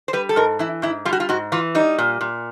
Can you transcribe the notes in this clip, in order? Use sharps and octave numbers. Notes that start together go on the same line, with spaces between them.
C5
G3 B4
A4
G#2 A#4
E3 E4
G#2 E4
G3 F4
F#4
F4
G#2 F#4
E3 F4
G3 D#4
A#2
A#2